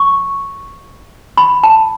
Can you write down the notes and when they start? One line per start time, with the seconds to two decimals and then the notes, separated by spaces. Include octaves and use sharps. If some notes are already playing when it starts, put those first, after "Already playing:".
Already playing: C#6
1.37 B5
1.63 A5